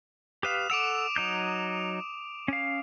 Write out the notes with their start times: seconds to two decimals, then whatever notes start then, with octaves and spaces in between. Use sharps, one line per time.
0.43 G4 B4 F5 D#6 E7
0.70 A4 F#5 D6 E6 D7 F7
1.16 F#3 D#4 G6
2.48 C#4 F5